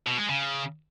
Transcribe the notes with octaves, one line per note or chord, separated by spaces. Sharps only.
B2
G#3
C#3